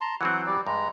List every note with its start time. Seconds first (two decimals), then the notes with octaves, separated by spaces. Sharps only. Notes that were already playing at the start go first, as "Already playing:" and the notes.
0.01 A5 A#5 C6
0.21 E3 F#3 C4 F#5
0.46 G3 D5
0.67 G2 G#3 A#5